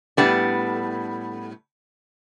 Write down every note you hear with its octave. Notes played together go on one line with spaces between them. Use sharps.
A2 G3 B3 D4